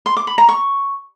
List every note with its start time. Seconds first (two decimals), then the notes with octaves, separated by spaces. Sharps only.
0.06 C6
0.17 D6
0.27 B5
0.38 A#5
0.49 C#6